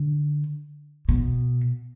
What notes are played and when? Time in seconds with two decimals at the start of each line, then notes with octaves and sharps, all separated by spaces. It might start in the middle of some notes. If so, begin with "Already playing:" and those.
Already playing: D3
1.09 B2